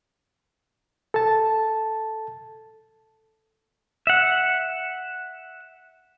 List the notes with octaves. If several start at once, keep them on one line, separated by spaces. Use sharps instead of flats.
A4 A5
E5 F#5